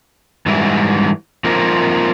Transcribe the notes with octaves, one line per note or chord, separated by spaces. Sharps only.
G#2 E3 G3
F3 A#3 C4 D#4